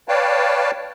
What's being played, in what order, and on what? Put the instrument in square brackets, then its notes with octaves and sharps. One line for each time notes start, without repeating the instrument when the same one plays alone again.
[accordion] B4 C#5 D5 F5 G5 A5